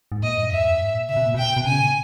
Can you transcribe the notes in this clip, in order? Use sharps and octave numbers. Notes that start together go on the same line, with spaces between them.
G#2
A#2 D#5
G2
E2 E5
G2
G#2
A#2
C#3 E5
B2
A#2
B2 G5
B2
C#3 G#5
A#2